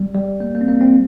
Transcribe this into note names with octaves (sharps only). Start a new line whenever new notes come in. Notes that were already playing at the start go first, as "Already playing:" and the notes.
Already playing: G3
G3
A#3
A#3
C4
A#3
C4